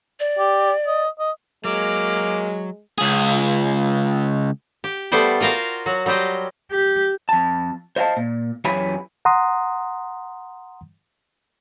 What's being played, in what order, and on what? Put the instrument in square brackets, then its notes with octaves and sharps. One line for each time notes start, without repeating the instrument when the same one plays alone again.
[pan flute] D5
[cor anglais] G4
D#5
D#5
[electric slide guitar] F#3 [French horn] G#3 [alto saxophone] A#3 [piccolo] D6
[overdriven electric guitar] C#2 G#4
[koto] G4
G3 A3 B3 C5 D5
F4 F#4 A#4 C5 F5
F#3 F#4
F#3 G3 G4 C5 D#5
[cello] G4
[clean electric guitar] F2 A5
C5 D#5 F5 F#5 A5
A#2
F#2 E3 G4 C#5 G#5 B5
[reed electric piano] F#5 A#5 C6 D#6